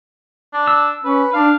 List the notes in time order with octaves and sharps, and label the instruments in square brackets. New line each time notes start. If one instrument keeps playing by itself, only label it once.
[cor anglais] D4
[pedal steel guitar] E6
[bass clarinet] C#4 [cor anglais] B4
[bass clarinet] D4 [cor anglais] F5